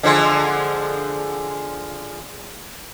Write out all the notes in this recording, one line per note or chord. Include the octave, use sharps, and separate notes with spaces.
D3 F3 G#3